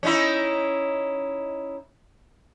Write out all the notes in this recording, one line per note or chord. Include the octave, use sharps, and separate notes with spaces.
C#4 D#4 E4